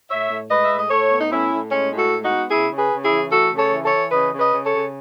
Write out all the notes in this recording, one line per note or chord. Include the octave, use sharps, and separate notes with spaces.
A2 C#5 E5
A2
G#3 B4 D#5
E5
A2
D#5
A2 A4 C#5
B3
D#4
A2 C#4 E4
A2
G#3 C#4
A2
F#4 A4
G#3
D#4 F#4
B3
C#3 E4 G#4
C#3
G#4 B4
C#3
E4 G#4
E3
A3 F#4 A4
C#3
A4 C#5
E3
A4 C#5
E3
C#3 B4 D#5
C#3
B4 D#5
C#3
A4 C#5
C#3